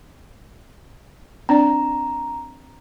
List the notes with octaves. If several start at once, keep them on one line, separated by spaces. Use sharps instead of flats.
C4 D4 D5 A#5